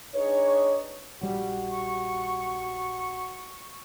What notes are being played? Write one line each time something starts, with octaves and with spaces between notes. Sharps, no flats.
D4 D#4 G#4 B4 C#5
A#1 G3 F#4
C#6